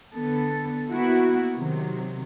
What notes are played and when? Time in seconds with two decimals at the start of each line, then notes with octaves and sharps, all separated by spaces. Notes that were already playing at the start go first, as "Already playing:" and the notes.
0.13 D3 B3 A4
0.91 A#3 B3 E4 F#4
1.55 C3 D#3 F#3